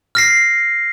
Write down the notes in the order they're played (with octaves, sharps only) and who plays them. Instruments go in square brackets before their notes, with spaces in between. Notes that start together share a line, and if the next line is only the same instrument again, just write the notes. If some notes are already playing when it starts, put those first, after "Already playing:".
[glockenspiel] F6 A#6 C7